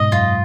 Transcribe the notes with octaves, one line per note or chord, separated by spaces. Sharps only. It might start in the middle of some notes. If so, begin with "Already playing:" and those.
Already playing: G#2 B2 D#5
F#2 F4